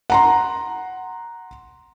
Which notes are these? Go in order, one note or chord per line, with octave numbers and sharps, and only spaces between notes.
F#5 A#5 C6